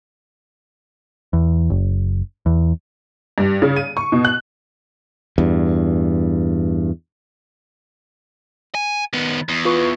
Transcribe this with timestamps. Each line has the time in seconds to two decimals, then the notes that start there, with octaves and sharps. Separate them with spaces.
1.33 E2
1.70 F#1
2.46 E2
3.38 G2
3.62 C#3
3.76 D#7
3.97 C#6
4.12 B2
4.25 F#6
5.38 E2 G2
8.75 G#5
9.13 D#3 B3
9.49 E2
9.65 F4 B4 C#6